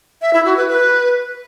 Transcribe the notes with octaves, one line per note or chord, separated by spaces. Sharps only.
E5
E4
F#4
B4
B4